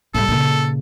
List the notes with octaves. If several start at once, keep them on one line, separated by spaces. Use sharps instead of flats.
A2 G3 A4
A#2 C#3